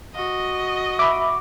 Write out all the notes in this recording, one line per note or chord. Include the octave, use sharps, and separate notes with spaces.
F#4 D#5
E5 B5 D6